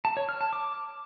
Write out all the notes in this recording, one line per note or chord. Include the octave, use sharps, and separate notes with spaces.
A5
C#5
F6
A5
D6